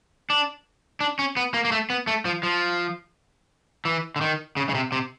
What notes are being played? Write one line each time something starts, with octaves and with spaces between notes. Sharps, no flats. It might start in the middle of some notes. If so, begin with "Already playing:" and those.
D4
D4
C#4
B3
A#3
A#3
A3
B3
A3
F3
F3
E3
D3
D#3
C#3
C#3
C3
C3